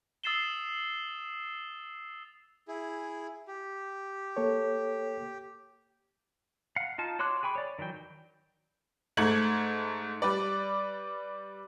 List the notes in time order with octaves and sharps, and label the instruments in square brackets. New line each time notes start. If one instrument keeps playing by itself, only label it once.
[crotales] D#6 E6 A6 C7 E7 G7
[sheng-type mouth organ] E4 G#4
G4
[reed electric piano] A#3 A4 C#5
[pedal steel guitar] F5 F#5
D#4 F4 A5
F#4 C#5 C6 D6 F#6
G#4 G5 B5 C#6
C#5 D5
D#3 E3 F#3 G5
[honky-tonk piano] G#2 A3 G#6 F#7
G3 B4 D5